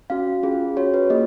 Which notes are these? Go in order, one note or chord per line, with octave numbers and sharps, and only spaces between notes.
C#4 F#4 F5
C#4 F4 G#4
C#4 F#4 C#5
B4
A#3 F4 G#4 D#5